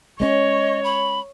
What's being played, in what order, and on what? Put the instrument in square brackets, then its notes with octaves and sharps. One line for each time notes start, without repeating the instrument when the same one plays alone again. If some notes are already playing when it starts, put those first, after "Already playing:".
[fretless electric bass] G#3 C4 C#4 [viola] C#5 [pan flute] D#5
[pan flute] B5